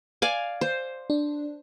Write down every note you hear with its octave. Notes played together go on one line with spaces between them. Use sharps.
D5 F5 G#5
C5
D4